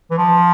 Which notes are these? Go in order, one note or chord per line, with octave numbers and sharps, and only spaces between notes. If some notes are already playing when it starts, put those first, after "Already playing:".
E3
F3